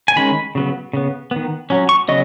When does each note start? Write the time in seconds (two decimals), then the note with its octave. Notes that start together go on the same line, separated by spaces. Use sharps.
0.08 G#5
0.16 D#3 G#3 C#4 B5
0.55 C#3 F#3 B3
0.93 C#3 B3
1.31 D#3 B3
1.70 F#3 C#4
1.89 C#6
2.08 C#3 F#3 B3 D#5